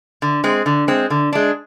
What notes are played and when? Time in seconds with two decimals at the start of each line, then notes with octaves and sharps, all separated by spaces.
0.22 D3
0.44 G#3 C4
0.66 D3
0.88 G#3 C4
1.10 D3
1.33 G#3 D4